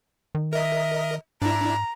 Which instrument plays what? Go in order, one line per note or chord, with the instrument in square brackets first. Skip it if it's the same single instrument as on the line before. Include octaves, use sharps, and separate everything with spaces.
[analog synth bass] D#3
[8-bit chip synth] A#4 D#5 [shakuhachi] E5
[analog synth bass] G#2 [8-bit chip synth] D4 E4 [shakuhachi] A#5